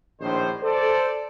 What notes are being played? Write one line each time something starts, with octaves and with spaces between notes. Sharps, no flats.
A#1 A2 D#3 D4 C5
A4 C5 D5